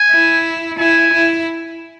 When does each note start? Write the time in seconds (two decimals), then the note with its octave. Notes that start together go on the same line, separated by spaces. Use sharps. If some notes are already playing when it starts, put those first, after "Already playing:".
Already playing: G#5
0.11 E4
0.78 E4 G#5
1.13 E4